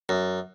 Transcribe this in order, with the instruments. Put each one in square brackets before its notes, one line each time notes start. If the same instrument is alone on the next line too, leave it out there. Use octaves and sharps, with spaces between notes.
[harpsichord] F#2